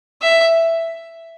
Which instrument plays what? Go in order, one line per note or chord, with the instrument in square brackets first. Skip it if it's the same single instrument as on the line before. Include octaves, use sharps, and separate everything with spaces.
[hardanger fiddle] E5